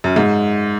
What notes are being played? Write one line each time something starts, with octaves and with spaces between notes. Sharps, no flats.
F#2
G#2